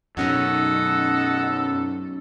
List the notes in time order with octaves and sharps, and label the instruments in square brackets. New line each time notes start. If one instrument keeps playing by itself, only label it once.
[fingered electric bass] F#2 B2 [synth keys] F#3 C#4 D#4 [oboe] A4 [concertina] D#5 F#5